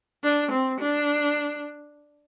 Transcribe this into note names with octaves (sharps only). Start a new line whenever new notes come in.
D4
C4
D4